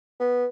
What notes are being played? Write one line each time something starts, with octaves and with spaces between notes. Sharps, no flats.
B3